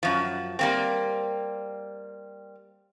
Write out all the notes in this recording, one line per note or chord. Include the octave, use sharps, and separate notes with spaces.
F#2 F3
G3 A#3 C4